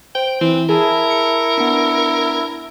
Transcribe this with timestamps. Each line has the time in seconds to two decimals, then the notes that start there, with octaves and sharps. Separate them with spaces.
0.15 C5 G5
0.41 E3 C4
0.69 E4 G#4 A#4 E5 A5
1.10 C#7
1.58 B3 D4